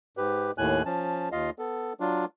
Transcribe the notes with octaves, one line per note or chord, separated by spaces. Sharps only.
G#2 G4 B4
D#2 A2 G#5 F#6
F3 C#4 A5
D#2 F4 D#5 F5
B3 A4
F#3 D4 F4